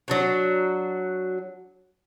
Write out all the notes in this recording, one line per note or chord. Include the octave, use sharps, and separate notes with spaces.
F#3 D4 F#4